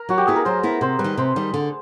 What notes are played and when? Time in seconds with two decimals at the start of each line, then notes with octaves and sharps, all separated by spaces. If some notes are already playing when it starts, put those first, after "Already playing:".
Already playing: A#4
0.09 F#3 F#4
0.18 G4
0.27 B3 E4 G#4
0.36 A#4
0.45 F#3 C5
0.63 B3 E4
0.81 C3 C5
0.99 G3 B4
1.04 D#3
1.17 C3 C5
1.36 D#3 G3
1.54 D3